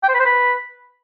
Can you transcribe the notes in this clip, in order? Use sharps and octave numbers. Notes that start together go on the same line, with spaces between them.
G5
C5
B4
C5
B4